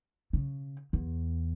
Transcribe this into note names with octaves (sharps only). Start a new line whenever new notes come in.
C#3
E2